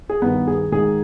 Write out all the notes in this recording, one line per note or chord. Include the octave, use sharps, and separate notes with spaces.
G#4
G2 D#3 B3 B4
G#4
G#2 D#3 G#4